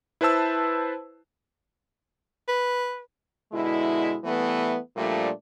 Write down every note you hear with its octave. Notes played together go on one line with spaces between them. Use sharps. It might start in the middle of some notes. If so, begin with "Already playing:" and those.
E4 B4 C5 A5 E6
B4
B2 D3 G#3 E4
E3 G3 A3 B3
A#2 F3 G3 A3 D4